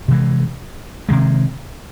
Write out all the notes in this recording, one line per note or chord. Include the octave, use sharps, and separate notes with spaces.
C3 E3 G#3
C3 D#3 G#3